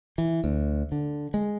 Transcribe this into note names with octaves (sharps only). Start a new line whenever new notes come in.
E3
D2
D3
G#3